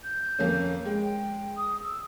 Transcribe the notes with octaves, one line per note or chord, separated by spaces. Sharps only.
G6
F2 A#3 C#4
G#3 G5
D#6
E6